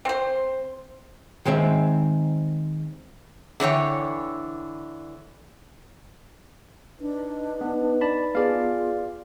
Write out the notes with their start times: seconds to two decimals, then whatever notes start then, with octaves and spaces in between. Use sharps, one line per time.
0.05 C4 C5
1.45 D#3 G#3 C4 E5
3.60 D3 E3 C#5 G5
7.00 D4 D#4 B4
7.61 B3
8.01 D5 A5 B5
8.35 B3 F4 G#4 D5 F5